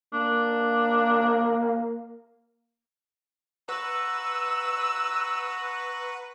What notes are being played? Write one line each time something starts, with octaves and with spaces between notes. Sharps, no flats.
A#3 D4
B4 F#5 A#5 C#6 E6